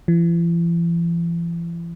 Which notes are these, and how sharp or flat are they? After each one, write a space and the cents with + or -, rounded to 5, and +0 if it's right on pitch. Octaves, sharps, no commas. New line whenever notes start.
E3 +45